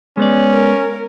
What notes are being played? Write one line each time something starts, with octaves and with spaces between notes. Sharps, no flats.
G#3 B3 C#4 D5
A#4